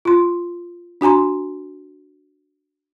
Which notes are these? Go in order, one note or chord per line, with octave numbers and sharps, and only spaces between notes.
F4 C6
D4 F#4 G#5 A#5 C6